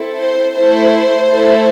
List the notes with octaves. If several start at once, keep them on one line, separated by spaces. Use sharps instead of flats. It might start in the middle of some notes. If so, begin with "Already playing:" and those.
Already playing: C4 E4 A4
C5
A3 E4 A4 C5
A3 E4 A4